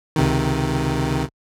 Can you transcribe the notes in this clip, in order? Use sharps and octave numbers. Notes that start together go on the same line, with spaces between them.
C#2 C3 D#3